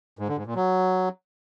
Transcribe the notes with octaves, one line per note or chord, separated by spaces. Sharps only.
G#2
D3
G#2
A#2
F#3